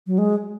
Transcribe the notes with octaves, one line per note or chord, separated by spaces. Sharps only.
F#3
G#3